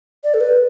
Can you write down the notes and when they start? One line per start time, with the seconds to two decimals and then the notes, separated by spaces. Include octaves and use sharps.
0.24 D5
0.34 A4
0.41 B4